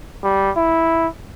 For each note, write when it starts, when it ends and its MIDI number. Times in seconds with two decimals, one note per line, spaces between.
0.23 0.51 55
0.56 1.07 64